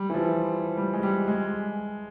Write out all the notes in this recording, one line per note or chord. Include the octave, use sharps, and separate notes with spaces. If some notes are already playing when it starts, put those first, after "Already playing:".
Already playing: G3
E3
F3
G3
G#3
G3
G#3